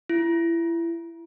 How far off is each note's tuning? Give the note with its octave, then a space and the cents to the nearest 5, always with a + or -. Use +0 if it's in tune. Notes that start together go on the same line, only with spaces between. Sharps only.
E4 +25